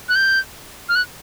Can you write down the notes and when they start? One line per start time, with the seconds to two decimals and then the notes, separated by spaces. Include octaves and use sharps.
0.09 F#6
0.16 G6
0.89 F6
0.95 F#6